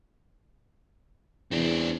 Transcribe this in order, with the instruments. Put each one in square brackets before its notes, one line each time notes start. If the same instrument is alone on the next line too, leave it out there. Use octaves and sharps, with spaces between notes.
[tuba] E2 [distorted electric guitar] C4 D4